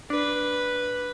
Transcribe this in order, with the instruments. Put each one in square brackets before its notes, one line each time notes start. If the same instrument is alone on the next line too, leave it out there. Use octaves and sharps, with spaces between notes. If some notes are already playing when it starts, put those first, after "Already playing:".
[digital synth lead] D4 [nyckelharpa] B4